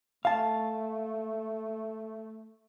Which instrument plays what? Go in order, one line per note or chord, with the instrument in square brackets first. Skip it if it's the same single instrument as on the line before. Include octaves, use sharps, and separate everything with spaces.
[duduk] A3 [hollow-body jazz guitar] F5 A5